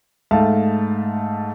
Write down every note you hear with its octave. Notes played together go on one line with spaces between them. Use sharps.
G#2 A3 F5 A5